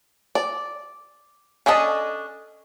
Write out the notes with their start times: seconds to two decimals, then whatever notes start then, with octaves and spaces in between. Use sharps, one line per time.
0.35 D5
1.66 C#4 D4 A4 D#5 A5